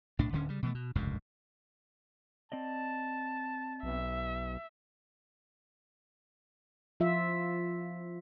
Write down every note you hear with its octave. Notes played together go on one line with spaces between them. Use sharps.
B1 A2 D4
D1 D3 C#4
C#3 G3
B2 E3 A3
B2
F1 C#2 G2 A#2
C4 D5 D#5 A5
B1 E5
F3 F4 E5